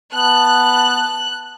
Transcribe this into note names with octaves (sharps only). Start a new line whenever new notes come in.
B3 A5 F#6